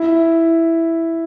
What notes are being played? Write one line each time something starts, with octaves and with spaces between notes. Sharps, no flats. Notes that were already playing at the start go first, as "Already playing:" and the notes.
Already playing: E4